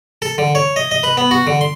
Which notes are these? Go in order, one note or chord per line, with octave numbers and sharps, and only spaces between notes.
A4
D3
C#5
D#5
D#5
B4
B3
F#4
D3
C6